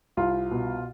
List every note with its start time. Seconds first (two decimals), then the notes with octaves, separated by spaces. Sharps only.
0.17 C2 F4
0.51 B2